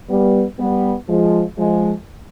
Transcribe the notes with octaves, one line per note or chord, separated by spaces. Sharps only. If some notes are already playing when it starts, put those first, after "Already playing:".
G3 B3
G3 B3
F3 G#3
F3 G#3